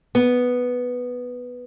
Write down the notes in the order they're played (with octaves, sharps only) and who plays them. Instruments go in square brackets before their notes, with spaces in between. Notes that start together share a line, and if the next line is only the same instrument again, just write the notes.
[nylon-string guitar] B3